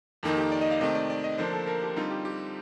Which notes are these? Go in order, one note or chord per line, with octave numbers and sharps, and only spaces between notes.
F2 D#3 A#3 D#4 A4
G4
D5
D#5
F5
C3 D#3 A3 C4 D#5
D5
D5
D#5
D3 F3 A#3 D4 C5
A4
A#4
G4
D3 G3 C4 D#4 F4
G4
G4